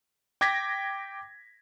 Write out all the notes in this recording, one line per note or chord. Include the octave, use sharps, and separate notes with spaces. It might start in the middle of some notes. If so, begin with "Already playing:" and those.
G5 D6 G#6 A#6 B6